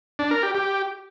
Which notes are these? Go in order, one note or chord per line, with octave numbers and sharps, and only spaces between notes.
D4
A#4
G4
G4